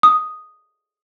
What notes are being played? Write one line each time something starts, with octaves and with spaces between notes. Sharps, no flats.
D#6